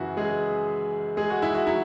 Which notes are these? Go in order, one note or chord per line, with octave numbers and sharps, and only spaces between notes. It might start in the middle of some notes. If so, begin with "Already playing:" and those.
Already playing: F#2 C#3 E3 E4 F#4
G#3 G#4
G#3 G#4
F#4
E4
F#4
F#3 E4